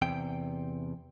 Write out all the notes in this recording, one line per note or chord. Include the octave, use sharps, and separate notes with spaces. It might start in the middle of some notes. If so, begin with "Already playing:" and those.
E2 C3 G5